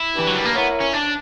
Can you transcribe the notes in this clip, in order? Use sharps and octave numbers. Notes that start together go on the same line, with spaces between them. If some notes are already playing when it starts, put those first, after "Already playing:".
Already playing: E4
E3 D4 G4 B4
F#3
G3
A#3
B3 E4 A#4 C#5
C#4
D4